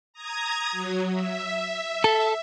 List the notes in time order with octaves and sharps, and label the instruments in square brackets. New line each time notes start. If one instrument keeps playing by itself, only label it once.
[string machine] A#5 D#6 G#6
F#3
E5
[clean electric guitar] A4